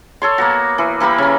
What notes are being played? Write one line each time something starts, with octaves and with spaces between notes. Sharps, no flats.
A4 C#5 C6
A#3 B3 F#4
E3
E3 A#3 G4 B5
C#3 C#4